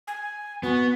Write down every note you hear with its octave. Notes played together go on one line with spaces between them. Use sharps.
G#5
B3 F#4